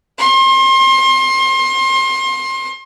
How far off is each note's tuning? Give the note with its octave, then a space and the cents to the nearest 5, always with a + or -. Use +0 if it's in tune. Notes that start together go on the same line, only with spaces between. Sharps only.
C6 +30